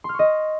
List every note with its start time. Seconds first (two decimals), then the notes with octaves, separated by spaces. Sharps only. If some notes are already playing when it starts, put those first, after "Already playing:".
0.04 C6
0.09 F6
0.14 C#6
0.19 D#5